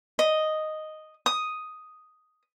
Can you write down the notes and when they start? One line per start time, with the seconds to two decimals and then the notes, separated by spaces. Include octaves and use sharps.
0.19 D#5
1.26 D#6